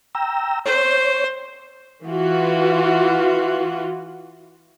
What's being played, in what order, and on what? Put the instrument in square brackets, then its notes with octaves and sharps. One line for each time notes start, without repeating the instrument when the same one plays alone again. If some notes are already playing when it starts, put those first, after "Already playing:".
[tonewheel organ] G5 A#5 E6
[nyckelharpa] C5 [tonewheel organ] C#5
[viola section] E3 F4 F#4